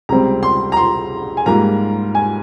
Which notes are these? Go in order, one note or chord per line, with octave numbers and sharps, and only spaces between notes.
C#2 C3 G3 C4 A#5
C6
A#5
C6
G#5
G#2 G3 A#3 F4 A#5
G#5